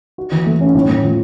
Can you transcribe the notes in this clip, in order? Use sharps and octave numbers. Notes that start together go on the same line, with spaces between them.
F#4
E3
A3
C#4
A2
A2
F3